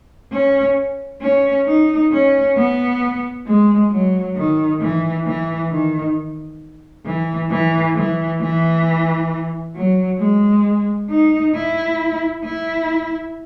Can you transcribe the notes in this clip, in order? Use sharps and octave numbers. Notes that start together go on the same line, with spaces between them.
C#4
C#4
D#4
C#4
B3
G#3
F#3
D#3
E3
E3
D#3
E3
E3
E3
E3
F#3
G#3
D#4
E4
E4